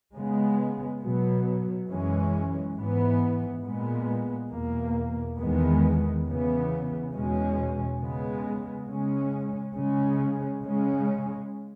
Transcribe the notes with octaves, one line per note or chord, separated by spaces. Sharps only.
C#3 G#3 B3
B2 F#3 B3
F#2 E3 G#3 C#4
G#2 E3 B3
A#2 G#3 B3
E2 B2 A#3
E2 D#3 G#3 B3
C#3 E3 B3
E2 B2 G#3 C#4
C#3 G#3 B3
C#3 G#3 C#4
C#3 G#3 C#4
C#3 G#3 C#4